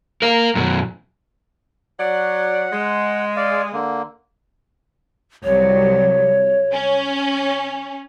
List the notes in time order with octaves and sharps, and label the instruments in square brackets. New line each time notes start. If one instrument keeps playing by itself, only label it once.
[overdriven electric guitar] A#4 F5
F#2 B2
[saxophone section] F#3 D5 [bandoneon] F#5
[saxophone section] G#3
[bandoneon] D5 F5
D3 A#3
[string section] C2 F#3 [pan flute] C#5
[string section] C#4